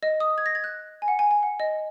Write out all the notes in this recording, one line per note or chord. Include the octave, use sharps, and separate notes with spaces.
D#5
D#6
G#6
A#6
G#6
F#6
G#5
F#5
G#5
G#5
F#5
D#5